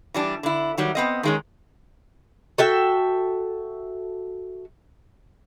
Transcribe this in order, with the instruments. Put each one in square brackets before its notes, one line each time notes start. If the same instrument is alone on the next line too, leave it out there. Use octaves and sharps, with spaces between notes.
[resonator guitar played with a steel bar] E3 G3 D4
D3 E4
D#3 F#3 G3
B3 C4 D#5
D#3 G#3 C#4
[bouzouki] F#4 A4 E5 G5